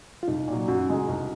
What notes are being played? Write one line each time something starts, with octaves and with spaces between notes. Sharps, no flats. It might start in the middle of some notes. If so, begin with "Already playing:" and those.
F4
C2 D#4
A#2
F#3
F#2 F#4
C#3 G#3 D#4 G#4
C2